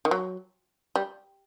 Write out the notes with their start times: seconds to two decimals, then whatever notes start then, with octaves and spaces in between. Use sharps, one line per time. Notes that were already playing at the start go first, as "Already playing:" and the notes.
0.05 D#3
0.11 F#3
0.96 G3